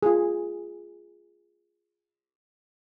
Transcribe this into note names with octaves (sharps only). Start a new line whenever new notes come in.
F4 G#4